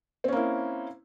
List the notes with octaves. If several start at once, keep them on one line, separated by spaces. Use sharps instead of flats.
A#3 C4 C#4 E4